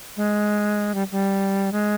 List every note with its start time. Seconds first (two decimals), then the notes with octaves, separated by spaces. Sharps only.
0.17 G#3
0.95 G3
1.12 G3
1.72 G#3